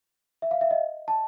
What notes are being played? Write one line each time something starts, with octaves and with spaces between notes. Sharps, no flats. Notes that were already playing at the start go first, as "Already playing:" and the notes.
E5
F5
E5
D#5
A5